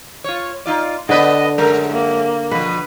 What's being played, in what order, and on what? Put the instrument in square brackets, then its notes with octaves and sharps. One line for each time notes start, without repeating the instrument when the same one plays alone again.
[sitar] F4 C#5
D#4 F4 D5
[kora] D3 [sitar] B3 B4 D5 [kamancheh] D#5
[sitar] F#2 G#3 [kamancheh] A#4
[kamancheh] A#3
[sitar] B2 F3 [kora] B4